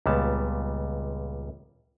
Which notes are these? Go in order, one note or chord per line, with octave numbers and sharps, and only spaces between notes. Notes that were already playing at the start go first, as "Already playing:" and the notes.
C#2 A#2 G3 B3 A5